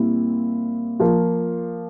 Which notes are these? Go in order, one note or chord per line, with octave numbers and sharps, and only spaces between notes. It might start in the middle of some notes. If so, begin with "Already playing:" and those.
Already playing: A#2 G3 C4 E4
F3 A#3 F4